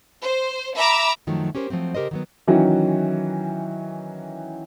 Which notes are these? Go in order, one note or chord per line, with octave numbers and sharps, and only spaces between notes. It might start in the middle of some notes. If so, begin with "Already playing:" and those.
C5
E5 A#5 B5 D6 E6
F#2 D#3 F3 F#3 A3
C#4 G4 A#4 C5
F3 F#3 A3 C4
C#3 G4 A#4 C5 D#5
D#3 F#3 B3
D#3 E3 F#3 C#4 F#4